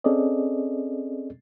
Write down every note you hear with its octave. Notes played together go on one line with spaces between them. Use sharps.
C4 C#4 G#4 A4 D5 D#5